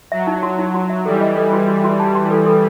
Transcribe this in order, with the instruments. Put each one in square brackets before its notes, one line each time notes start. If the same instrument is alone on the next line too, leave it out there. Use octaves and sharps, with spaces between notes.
[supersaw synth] F#3 [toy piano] E5
[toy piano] D#4
F#4
D#4
F#4
E5
[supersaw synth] E3 G3 [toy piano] A4
[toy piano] D#5
A4
F#4
F#4
F#4
A5
C6
A4
A4